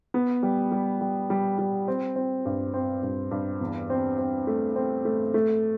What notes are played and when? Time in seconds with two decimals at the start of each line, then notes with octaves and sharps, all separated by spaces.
0.14 B3
0.43 G3
0.71 G3
1.01 G3
1.30 G3
1.59 G3
1.88 C4
2.16 C4
2.45 G2
2.74 C4
3.03 G2
3.31 G2
3.61 E2
3.90 C4
4.18 C4
4.47 A3
4.76 C4
5.05 A3
5.34 A3